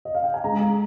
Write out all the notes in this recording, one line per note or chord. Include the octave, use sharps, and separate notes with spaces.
D#5
F5
G5
G#5
G#3 A#5
G#3